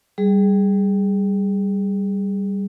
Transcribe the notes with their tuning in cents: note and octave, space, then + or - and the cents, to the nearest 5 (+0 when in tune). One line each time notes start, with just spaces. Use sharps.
G3 +0 G#4 +0